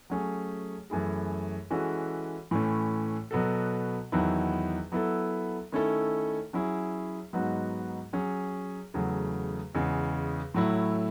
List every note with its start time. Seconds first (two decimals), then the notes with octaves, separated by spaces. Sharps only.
0.10 F#3 A3 C#4 G#4
0.90 F#2 E3 A3 E4 G#4
1.70 E3 G#3 C#4 F#4 A4
2.51 A2 E3 A3 C#4
3.31 B2 F#3 B3 F#4 A4
4.12 E2 D#3 F#3 B3 E4
4.92 F#3 B3 E4 A4
5.72 D#3 A3 C#4 E4 A4
6.53 F#3 C#4 E4 G#4
7.33 G#2 F#3 B3 D#4 F#4
8.13 F#3 C#4 G#4
8.94 E2 C#3 F#3 A3
9.75 E2 C#3 G#3
10.54 A2 F#3 A3 E4